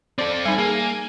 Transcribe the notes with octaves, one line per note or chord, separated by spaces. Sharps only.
C4 A4 D5
G3 D#4 G#5
A#3 G#4